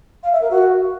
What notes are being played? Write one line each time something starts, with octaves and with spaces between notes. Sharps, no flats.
F5
E5
A#4
F#4